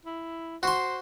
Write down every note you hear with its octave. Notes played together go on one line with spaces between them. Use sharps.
E4
F#4 C5 C6